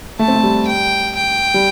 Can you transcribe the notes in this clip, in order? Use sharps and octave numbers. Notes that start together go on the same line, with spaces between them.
A3 A5
C4
A3
G3
G5
G5
G3